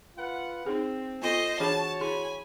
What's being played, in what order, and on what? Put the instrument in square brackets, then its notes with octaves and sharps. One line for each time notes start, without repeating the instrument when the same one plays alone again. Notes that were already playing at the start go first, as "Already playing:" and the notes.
[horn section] F4 B4 F#5
[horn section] C4 [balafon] D#4 G#4
[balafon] B3 F4 A4 [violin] C5 D#5
[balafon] E3 D4 G#4 [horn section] F#4 C#5 [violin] A5
[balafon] E4 G#4 C6 [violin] G#5 B5